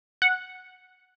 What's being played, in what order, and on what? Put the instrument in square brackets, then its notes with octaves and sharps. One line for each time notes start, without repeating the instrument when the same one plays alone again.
[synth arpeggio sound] F#5